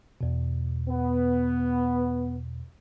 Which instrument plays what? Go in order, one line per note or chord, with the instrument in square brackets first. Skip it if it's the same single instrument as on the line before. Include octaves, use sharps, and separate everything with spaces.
[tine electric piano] E2 B2
[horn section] B3